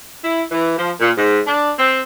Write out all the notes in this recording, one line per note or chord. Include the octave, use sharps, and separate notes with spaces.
E4
E3
F3
A#2
G#2
D4
C4